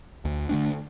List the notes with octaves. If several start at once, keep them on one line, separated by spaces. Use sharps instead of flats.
D2
D3 A3 D4